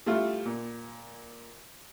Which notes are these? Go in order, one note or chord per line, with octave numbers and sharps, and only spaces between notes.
G3 A3 E4 F4
A#2